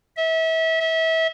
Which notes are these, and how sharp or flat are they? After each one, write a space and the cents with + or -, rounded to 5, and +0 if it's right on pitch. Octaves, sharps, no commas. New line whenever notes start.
E5 -30
E5 -30